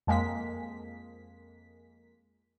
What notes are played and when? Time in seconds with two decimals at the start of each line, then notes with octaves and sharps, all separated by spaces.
0.07 F2 G#3 A#3 B6